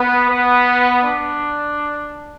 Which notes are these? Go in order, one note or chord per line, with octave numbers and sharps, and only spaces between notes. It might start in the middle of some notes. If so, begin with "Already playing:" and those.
Already playing: B3
B3
D4